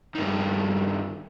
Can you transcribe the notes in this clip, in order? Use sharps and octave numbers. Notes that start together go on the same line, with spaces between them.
G2 D#3